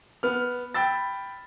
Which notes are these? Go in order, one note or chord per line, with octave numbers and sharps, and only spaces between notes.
B3 F6
G5 B5 E6 A6